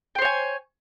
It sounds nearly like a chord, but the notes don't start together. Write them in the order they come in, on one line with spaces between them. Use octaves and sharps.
G5 C5 C#5 G#5